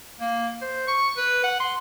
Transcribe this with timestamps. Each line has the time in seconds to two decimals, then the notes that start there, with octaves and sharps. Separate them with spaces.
0.20 A#3
0.62 C5
0.88 C#6
1.17 B4
1.44 F#5
1.60 C6